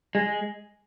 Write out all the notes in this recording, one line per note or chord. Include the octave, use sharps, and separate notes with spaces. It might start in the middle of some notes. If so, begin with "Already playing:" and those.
G#3